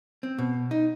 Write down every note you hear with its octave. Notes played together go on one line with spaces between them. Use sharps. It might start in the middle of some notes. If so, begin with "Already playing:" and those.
C4
B2
D#4